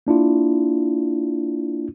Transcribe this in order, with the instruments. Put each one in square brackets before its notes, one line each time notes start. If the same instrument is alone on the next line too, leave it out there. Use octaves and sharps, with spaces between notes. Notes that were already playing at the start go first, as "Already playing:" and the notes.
[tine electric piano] A#3 D4 E4 F4